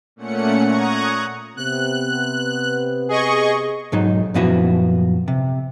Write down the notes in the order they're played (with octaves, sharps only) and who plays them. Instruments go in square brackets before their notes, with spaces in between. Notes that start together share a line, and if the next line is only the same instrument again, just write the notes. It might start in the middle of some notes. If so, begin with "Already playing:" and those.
[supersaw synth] A#2 A3 C#4 F#5 C#7
A#5 C#6 D#6 F#6 G#6
[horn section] C3 B3 [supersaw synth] F#6
[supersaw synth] G#4 D#5 C#6
[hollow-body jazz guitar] B1 G#2 F#3 D#4
F#2 A#2 F3 B3 E4 F#4
C3